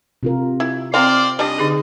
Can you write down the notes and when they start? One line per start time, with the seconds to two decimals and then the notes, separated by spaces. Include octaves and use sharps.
0.23 C3 F4 A#4
0.60 E4
0.94 C4 C5 D5 F5 G5 C6
1.39 G3 D4 D#5
1.58 D3 D#4 G#4